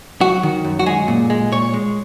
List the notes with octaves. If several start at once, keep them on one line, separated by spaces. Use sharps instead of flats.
F#3 F#4
D#3
F#2
F#4
G#3 G#4
A#2
G#3
A#2 C#5
G#3